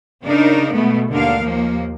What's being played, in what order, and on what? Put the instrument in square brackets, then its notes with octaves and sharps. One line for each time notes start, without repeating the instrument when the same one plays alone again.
[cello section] C#3 D4 D#4 A#4
B2 G#3 A3 B3
D#2 D3 D4 A#4 F5
D#2 F3 A#3